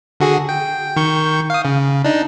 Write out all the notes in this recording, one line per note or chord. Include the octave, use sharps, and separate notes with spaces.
D3 F#4 G#4
G5
D#3 C#6 G6
F5 D#6
C#3
D4 D#4